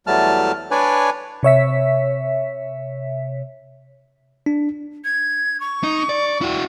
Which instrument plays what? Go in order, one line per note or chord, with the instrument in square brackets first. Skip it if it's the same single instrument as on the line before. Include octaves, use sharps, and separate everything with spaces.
[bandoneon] E2 F#3 G3 A3 A5 F6
D4 B4 C#5 D5 G#5
[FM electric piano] C3 C#5 E5 B6
[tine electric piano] D4
[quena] G#6
C#6
[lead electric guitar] D#4
D5
E4 F#4